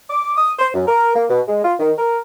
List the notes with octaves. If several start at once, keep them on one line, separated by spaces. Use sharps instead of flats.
D6
D#6
C5
F#2
A#4
A#3
B2
G#3
F4
D#3
A#4